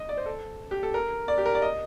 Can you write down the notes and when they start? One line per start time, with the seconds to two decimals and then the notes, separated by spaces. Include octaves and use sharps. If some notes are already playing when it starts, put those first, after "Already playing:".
Already playing: D#5
0.09 D5
0.17 C5
0.26 A4
0.71 G4
0.83 A4
0.94 A#4
1.28 D5
1.38 G4
1.46 A#4
1.55 D5
1.62 D#5